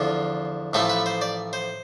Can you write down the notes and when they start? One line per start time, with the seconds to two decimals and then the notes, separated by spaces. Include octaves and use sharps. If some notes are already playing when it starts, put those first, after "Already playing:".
Already playing: E2 D3 F3 F4
0.73 A1 A2 F3 A3 A4
0.89 B4
1.06 C5
1.21 D5
1.53 C5